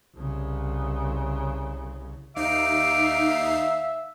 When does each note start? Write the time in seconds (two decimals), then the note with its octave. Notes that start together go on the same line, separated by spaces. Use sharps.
0.16 C2 C#3
2.36 D#2 D#4 E5 F5 D6 C7